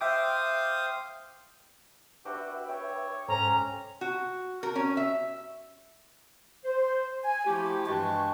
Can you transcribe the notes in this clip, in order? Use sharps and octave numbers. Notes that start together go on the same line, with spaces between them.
C5 E5 F5 G5 D6 D#6
D4 F#4 G4 B4 E5 G5
C#5 G5
G#2 C#4 A4 C5 A#5
F#4
A#4
C#4
E5
C5
G#5
F3 A3 E4 F#4 G4
G2 E3 G#3 G5 A5 C#6